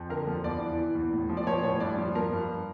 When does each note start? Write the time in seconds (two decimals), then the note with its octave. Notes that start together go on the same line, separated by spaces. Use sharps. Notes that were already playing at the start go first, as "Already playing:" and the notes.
Already playing: F2
0.09 D3 A#4
0.27 F3
0.44 E2 D5
0.61 E3
0.78 E3
0.95 E2
1.13 A2
1.29 F3
1.37 D5
1.47 F3 C#5
1.63 A2 C#5
1.80 G2 D5
1.98 F3
2.15 F3 A#4
2.32 G2